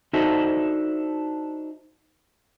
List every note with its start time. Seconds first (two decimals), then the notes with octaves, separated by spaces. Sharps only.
0.13 D4 D#4 F#4 A4 C5 E5